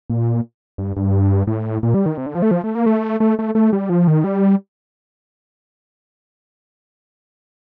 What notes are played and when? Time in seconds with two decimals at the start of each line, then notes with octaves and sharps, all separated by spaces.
0.10 A#2
0.78 G2
0.96 G2
1.47 A2
1.83 A#2
1.94 G3
2.06 D#3
2.18 C3
2.26 D3
2.35 F3
2.42 A3
2.51 F3
2.64 A3
2.75 A#3
2.86 A3
3.20 A3
3.39 A3
3.55 A3
3.73 G3
3.90 F3
4.07 D#3
4.24 G3